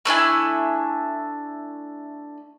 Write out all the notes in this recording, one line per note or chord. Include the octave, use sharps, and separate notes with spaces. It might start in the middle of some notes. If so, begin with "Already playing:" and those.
A3 D4 E4 G#5